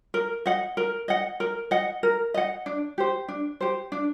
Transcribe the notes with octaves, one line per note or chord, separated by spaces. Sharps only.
A#4
D#5 F#5
A#4
D#5 F#5
A#4
D#5 F#5
A#4
D#5 F#5
D4
G4 C5
D4
G4 C5
D4